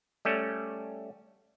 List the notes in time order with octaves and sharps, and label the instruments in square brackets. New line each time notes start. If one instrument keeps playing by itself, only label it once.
[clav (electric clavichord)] G3 A3 C#4